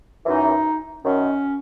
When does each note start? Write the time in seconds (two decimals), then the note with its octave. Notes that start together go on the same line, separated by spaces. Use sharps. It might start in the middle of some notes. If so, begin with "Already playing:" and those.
0.25 F#2 E3 D#4
1.02 F#2 D#3 F#3 C#4